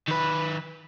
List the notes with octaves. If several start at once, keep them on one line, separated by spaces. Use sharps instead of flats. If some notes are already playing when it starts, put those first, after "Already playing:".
D#3 B4